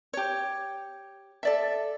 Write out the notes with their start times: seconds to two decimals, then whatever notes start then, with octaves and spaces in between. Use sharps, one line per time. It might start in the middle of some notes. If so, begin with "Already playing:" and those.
0.13 G4 C#5
1.43 A4 D5 E5